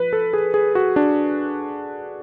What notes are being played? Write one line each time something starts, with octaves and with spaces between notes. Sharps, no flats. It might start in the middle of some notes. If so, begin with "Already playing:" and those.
Already playing: F3 B4
A4
G#4
G#4
F#4
D4